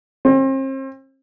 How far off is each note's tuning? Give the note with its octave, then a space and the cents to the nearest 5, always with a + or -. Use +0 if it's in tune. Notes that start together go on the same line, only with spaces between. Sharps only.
C4 +40